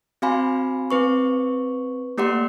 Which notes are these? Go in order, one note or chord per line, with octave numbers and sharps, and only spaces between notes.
C4 F#4 F5 G#5 B5 C6
C4 B4 C#6
A3 A#3 G4 D5 F#5 C6